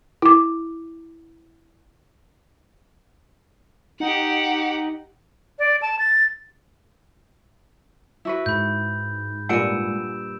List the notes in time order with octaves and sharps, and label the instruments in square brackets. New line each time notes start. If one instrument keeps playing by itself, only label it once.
[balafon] E4 D6
[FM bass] D#4 [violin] G4 F#5
[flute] D5
A5
A6
[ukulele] E4 F#4 B4
[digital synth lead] G#2 [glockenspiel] B5 G6
[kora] G2 A#2 [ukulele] F#5 G#5 [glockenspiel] E6 D7 E7